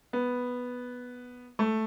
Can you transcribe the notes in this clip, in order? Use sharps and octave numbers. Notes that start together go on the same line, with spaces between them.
B3
A3